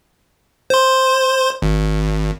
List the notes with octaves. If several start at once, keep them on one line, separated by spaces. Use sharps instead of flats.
C5 C6
G#1